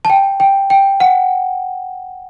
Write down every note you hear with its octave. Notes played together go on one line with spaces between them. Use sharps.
A5
G5
G5
G5
F#5